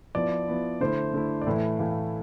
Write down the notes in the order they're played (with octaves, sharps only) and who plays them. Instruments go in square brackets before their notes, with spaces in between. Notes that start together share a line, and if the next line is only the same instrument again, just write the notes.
[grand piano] F3 B3 E4 [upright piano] D5
[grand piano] F3 B3 E4
[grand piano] D3 A3 E4 [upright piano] C5
[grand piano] D3 A3 E4
[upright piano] D5
[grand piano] A2 E3 A3 E4 [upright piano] E5
[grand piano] A2 E3 A3 E4 [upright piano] F5
[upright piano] F5